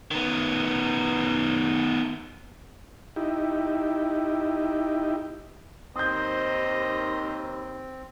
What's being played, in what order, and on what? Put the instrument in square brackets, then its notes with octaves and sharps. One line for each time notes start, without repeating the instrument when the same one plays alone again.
[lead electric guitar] D#3 B3
[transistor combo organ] D#4 E4 G4
[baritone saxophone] D#2 [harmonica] D#3 C5 D#5 [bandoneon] C4 [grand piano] D#6 G6